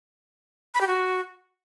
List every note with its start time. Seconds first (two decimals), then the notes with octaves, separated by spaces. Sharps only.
0.74 B5
0.81 G4
0.87 F#4